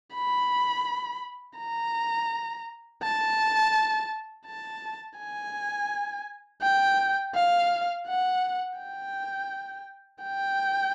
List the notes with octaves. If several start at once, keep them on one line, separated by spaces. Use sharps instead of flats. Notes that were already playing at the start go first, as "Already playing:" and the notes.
B5
A#5
A5
A5
G#5
G5
F5
F#5
G5
G5